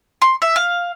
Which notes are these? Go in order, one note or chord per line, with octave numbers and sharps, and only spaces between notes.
C6
E5
F5